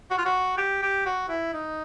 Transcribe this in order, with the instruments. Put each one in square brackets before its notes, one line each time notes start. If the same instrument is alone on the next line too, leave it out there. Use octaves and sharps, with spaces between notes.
[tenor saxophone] F#4
F4
F#4
G4
G4
F#4
E4
D#4